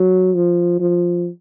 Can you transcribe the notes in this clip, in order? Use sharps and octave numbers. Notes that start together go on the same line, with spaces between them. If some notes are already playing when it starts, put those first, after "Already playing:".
Already playing: F#3
F3
F3